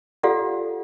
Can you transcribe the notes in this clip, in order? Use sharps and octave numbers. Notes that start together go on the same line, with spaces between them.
F4 G4 A4 D5 F5 F#5